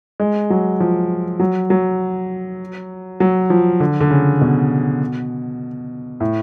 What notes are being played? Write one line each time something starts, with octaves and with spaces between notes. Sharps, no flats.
G#3
F#3
F3
F#3
F#3
F#3
F3
D3
D3
C#3
B2
A2